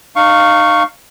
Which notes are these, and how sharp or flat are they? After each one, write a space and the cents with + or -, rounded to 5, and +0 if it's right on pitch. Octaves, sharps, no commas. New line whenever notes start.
D#4 -30 F5 +0 C#6 +0